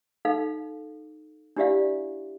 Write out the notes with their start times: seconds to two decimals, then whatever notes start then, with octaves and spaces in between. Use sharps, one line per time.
0.25 D#4 A4 F5
1.56 D4 E4 G4 D5 E5 F5